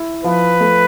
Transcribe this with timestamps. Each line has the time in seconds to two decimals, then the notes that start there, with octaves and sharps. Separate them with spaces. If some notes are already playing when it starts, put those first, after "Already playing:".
Already playing: E4
0.24 F3 B4
0.61 A3